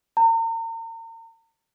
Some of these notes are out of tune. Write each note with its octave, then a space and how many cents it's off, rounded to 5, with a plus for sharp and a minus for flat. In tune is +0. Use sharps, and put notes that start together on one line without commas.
A#5 -40